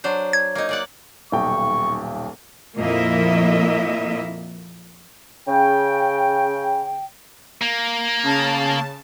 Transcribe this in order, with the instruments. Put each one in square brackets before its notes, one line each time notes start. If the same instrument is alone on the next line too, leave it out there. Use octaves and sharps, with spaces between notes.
[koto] F#3 D4 C5
[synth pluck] G#6
[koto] A#3 D#4
A#3 D5 F#5
[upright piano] D#1 B1 G5 [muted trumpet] C#6
[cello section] F2 A#2 A#3 E4 D#5 E5
[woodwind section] C#3 G5
[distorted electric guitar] A#3
[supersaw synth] C#3 A5